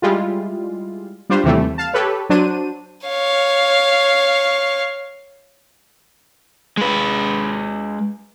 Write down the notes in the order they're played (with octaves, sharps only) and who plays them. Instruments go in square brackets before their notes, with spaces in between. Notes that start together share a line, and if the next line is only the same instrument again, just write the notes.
[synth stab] G3 G#3 E4 F4
G3 D4 F4 C5
D#2 C3 E3 G3 A3
F5 A5
G4 A4 B4 C#5
F#3 D4 C5 D#7
[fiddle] C#5 F5
[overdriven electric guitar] G#3 B4